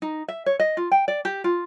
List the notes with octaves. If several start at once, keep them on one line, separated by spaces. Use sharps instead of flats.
D#4
E5
C#5
D#5
F4
G5
D5
G4
F4